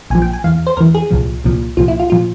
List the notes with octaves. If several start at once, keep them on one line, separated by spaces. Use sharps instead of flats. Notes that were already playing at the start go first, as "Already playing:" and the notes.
A#1 A#2 F3 G#5
G5
G#5
E2 E3 F5
C5
E2 E3 A#4
G#4
C2 A#2 F3
C2 A#2 F3
C2 A#2 F3 F4
E4
F4
A#2 F3 F4